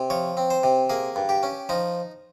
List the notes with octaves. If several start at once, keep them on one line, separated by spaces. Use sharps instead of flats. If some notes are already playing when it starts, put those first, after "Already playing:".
Already playing: C3
F3 C#5
C4
C5
C3
A#3 G#4
G2
G4
C#4
F3 D#4